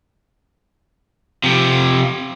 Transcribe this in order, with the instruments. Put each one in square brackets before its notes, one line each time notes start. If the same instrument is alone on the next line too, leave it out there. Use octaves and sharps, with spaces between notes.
[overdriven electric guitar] C3 F3